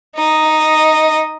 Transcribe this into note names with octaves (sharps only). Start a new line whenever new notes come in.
D#4 D#5